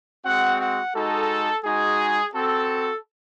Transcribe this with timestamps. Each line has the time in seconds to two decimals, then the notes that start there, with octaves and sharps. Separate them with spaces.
0.24 G#3 C4 F#4 F#5
0.58 F#5
0.94 G#3 D#4 F#4 A4
1.63 G#3 D#4 F#4 G#4
2.33 C4 F#4 A4